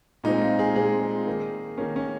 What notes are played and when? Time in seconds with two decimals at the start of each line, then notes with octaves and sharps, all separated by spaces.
0.24 A#2 G#3 C4 D#4
0.41 F4
0.59 G#4
0.76 A#2 G#3 C4 G#4
1.27 D#3 A#3
1.78 D#3 A#3 C#4
1.96 C#4